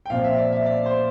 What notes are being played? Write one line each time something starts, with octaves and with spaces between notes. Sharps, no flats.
G5
A#2 F3 C4 F5
E5
D5
E5
D5
C5